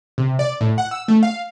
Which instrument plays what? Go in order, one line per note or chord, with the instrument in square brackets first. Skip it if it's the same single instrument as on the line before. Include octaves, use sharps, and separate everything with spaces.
[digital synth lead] C3
D5
A2
F#5
E6
A3
F5